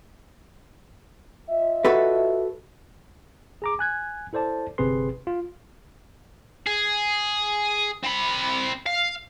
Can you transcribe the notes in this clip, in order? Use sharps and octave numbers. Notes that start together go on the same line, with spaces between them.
F4 D#5 E5
F#4 A4 B4
G#4 A#5 D6
G#5 F#6 G#6
E4 A4 C5 D5 A5
G1 C3 C4 G#4 B4 C6
F4
G#4
C4 B5
F5